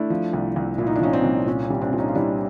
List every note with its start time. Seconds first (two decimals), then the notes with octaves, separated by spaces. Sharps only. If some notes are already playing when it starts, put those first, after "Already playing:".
Already playing: A3 D4 E4
0.10 F3
0.33 C2
0.56 C2
0.78 A#2 E4
0.87 D#4
0.95 D4
1.01 F3 C#4 D#4
1.13 C4 D4
1.24 C2
1.46 A#2 C#4
1.65 C#4
1.70 G3
1.81 C4 D4
1.93 A#2
1.98 C#4 D#4
2.08 F4
2.15 G3 D4 E4